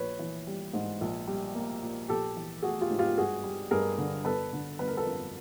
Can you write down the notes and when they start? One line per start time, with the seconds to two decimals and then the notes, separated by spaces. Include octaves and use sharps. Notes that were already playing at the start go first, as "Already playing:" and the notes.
Already playing: A#1 B4 C#5
0.19 E3
0.47 G3
0.73 G#2
1.01 A#1
1.27 G3
1.55 A#3
1.83 A#2
2.09 A#1 G4 A4
2.37 E3
2.62 A3 F#4 G#4
2.81 F4 G4
2.90 G#2
2.99 F4 G4
3.17 G2 F#4 G#4
3.44 G3
3.71 G2 G#4 A#4
3.98 D3
4.25 G1 A4 B4
4.53 D3
4.79 G1 B4
4.88 A#4
4.97 A4 B4
5.06 F2